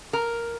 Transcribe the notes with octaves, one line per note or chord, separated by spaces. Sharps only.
A#4